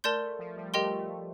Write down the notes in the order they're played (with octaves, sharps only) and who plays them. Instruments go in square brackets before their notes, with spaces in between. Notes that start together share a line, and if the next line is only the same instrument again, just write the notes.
[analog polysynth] A3 [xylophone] A#4 D5 A5 C6 G6
[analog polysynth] F3
G3
[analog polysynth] A3 [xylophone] G4 A#4 D#5 G5 C6
[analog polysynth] A3